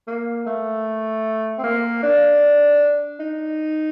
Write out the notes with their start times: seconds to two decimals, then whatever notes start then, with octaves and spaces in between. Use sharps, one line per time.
0.08 A#3
0.46 A3
1.58 C4
1.64 A#3
2.03 D4
3.20 D#4